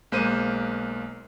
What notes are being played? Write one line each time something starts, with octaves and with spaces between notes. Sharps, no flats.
B1 G#3 A#3 C5 D#7